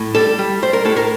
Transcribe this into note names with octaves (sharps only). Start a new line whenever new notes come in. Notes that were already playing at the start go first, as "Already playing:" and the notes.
Already playing: A2
G3 A4
G3
G3 C5
A#4
A2 A4
A#4